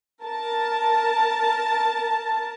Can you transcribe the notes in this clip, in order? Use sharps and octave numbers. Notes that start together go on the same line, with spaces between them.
A#4 A5